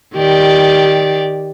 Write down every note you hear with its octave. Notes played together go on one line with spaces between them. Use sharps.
D#3 G4 D5